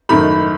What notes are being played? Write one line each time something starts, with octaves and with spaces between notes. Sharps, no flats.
F#1 F#2 D#3 A3 B5